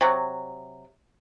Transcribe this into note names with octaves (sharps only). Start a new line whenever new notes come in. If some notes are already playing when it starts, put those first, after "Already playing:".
C3 F#3